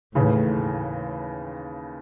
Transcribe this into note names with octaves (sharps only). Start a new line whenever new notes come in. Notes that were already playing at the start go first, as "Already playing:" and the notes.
D#2 A2 C#3 E3